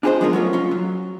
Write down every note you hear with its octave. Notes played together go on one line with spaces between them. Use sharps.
D4 F4 G#4 A#4 C5 D#5
F3 G#3 B3 F4 A#4
F#3 A3 C#4 F4
C#4 F4
F#3